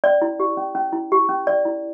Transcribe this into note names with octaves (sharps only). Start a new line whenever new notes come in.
C#4 D5
E4
G4
C#4
C#4
E4
G4
C#4
C#4 D5
E4